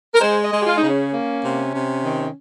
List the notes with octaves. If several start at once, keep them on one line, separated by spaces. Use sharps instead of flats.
A#4
G#3 C5
D#5
G#3
G4
F4
C#3 D#4
C#4
A#3
C3
C3
D#3